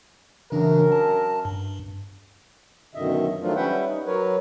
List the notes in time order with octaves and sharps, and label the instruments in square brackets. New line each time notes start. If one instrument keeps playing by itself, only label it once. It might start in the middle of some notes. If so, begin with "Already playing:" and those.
[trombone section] F#2 A#4 [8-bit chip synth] C#3 E3 D4
[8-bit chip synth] A5
G2
[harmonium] F#2 B2 D3 D#3 D#5 E5
D#3 F3 F#3 A3 D4 F4
G3 C#4 B4 E5 F#5 G5
D#4
F#3 A#4 B4 C#5